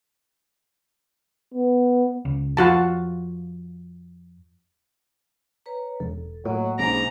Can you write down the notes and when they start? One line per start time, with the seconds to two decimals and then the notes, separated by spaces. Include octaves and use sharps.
1.54 B3
2.25 C#2
2.57 F2 F4 F#4 A5
5.66 B4 C#5 A#5
6.00 E1 A4
6.45 A2 F#3 A#3 D#5
6.79 B1 G#2 A#3 C#4 D4 A#5